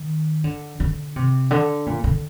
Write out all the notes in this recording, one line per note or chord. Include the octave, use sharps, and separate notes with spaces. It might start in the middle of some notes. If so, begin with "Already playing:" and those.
Already playing: D#3
D3
D3
C3
D3
A#2
D3